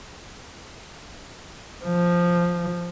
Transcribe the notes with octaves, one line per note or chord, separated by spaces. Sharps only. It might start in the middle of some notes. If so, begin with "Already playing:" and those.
F3